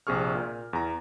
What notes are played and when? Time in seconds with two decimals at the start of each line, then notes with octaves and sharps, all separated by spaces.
0.07 A#1 C3 G#4 C#6 F6
0.35 A#2
0.73 E2 A#5